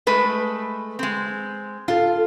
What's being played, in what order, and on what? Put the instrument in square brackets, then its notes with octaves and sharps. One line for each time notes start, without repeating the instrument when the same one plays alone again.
[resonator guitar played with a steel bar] G#3 A3 B4
G#3 C4
[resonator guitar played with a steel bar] F4 [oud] A4 F5